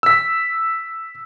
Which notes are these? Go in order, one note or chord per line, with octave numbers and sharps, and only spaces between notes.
E6 B6